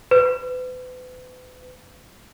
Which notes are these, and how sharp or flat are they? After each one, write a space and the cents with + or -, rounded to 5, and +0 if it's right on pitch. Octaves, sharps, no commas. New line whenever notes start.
B4 +40